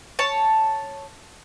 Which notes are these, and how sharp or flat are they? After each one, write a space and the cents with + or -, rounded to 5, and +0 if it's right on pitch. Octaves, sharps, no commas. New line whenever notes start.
C#5 +0 A5 +0